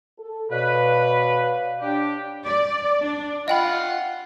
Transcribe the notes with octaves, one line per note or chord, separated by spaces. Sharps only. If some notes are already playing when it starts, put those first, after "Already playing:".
A4
B2 B4 C#5 D5 F5
D4 G4
D5
D4
F4 D#5 F#5 G5 B5